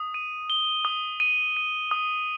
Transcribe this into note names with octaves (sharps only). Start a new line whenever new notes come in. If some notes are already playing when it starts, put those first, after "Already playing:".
Already playing: D#6
D#7
G7
D#6
D#7
D#7
D#6